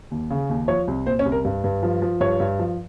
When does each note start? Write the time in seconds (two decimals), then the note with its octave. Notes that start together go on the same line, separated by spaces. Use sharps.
0.11 D#2
0.30 C#3
0.50 D#2
0.68 F3 C#5
0.88 C2
1.06 A#2 C5
1.19 C#4
1.26 C2
1.32 A#4
1.45 G2
1.64 G2
1.83 F3
2.02 F3
2.20 G2 C#5
2.40 G2
2.59 F3